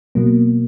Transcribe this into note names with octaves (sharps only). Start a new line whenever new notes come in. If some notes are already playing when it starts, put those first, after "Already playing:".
B2 F#3 A#3